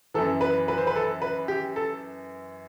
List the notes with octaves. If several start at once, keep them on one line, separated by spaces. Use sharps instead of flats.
F#2 E3 A4
B4
B4
C5
B4
A4
B4
G4
A4